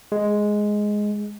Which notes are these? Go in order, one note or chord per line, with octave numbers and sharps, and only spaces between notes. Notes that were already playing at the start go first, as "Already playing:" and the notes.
G#3